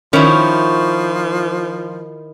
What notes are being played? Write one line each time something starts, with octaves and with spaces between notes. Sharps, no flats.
D#3 F3 C#4 E4 C#5